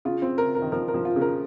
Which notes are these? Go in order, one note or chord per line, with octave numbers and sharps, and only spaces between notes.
C#3 F4
C4
A#4
A#4
D#3
F3 A#4
A#4
F3
F4
C#3
A#4